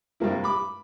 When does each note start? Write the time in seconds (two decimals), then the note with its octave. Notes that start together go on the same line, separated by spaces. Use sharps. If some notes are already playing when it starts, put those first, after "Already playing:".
0.20 G2 C3 A#3 E4
0.44 B5 D6